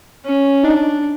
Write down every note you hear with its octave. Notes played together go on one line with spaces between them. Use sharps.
C#4
D4 D#4